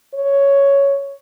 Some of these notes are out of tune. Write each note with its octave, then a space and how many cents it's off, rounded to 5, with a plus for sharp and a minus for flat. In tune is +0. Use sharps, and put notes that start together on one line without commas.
C#5 +5